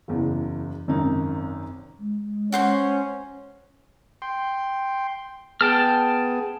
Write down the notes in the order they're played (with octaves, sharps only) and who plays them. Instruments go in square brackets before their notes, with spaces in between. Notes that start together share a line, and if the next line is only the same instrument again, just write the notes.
[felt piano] F#1 E2
G#1 F#2 C3 D#4
[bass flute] G#3
[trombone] C#4 [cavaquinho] F#4 C5 C6
[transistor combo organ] G5 C6
[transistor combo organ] B3 G#4 [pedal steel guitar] G5 A5 F6